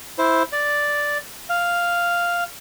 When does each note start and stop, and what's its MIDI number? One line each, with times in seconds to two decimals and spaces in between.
0.18 0.43 64
0.18 0.43 72
0.53 1.18 74
1.50 2.44 77